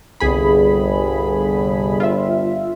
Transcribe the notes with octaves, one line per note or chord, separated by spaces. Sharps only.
G1 C2 G#4 B5
F4 E5